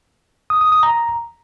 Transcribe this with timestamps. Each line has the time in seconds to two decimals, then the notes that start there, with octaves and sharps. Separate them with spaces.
0.50 D#6
0.61 D#6
0.72 D#6
0.83 A#5